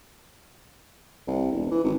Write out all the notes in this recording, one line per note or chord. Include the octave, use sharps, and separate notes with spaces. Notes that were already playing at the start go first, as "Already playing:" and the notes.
C2
E1
E3
G#1